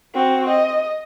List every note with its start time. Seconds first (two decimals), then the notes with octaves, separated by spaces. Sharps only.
0.14 C4 F#4
0.49 D#5